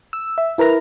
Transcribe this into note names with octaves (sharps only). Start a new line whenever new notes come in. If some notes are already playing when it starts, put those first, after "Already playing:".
E6
E5
E4 A#4 B4 A#5